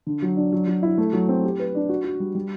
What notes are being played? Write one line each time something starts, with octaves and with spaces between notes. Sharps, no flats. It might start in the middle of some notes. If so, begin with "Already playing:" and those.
D3
F#3
D4
F#3
F#3
E4
A3
F#3
C4
G4
B4
D4
F#4
F#4
G3
G3